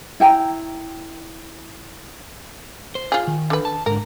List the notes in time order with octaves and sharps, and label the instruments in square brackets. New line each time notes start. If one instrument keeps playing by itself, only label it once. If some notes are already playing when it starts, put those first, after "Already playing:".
[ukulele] E4 G5 G#5 A#5
[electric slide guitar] C5
[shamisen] F4 G#4
[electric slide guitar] D#3
[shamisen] D3 B4
[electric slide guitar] A5
[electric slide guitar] G#2 D3 [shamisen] A#4